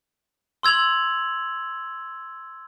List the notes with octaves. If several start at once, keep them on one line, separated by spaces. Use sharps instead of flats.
C6 E6 G#6 F7 F#7